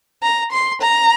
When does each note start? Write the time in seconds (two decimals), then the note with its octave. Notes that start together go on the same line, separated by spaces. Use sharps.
0.23 A#5
0.52 C6
0.81 A#5